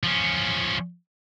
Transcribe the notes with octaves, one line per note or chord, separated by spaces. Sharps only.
F3 C#4